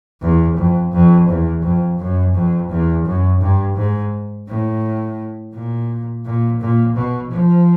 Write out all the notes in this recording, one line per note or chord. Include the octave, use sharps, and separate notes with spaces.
E2
F2
F2
E2
F2
F#2
F2
E2
F#2
G2
G#2
A2
A#2
A#2
A#2
B2
F3